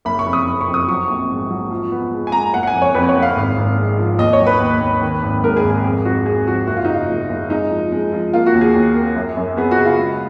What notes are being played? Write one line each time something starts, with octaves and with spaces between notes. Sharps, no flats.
F#1 B5
C#6
F2
D#6
F#1
C#6
F2
D#6
F#3 C#6
A#1 C#6
G#2
F#3
F3
B3
G#3
G#5
G#3 A#5
F#1 F#5
F#5
G#5
F2
C#5
F2 B4
C#5
F#1
F5
G#1
G#1
G#3
F3
D#2 D#5
C#5
F#3
B4
D#2
D#2
D#3
G#1
G#2 A#4
G#4
G#1
G#4
F2 G#4
F2 F#4
F2 G#4
F2 F#4
F#1 F#4
F4
D#4
C#3
F4
F#1
F#1
G#3 D#4
F3
G#3
F3
A#3 F4
F#4
D#2
G#4
D#2
A#3
F#2
F#2
B3 G#4
F#4
C#3
F4
G#3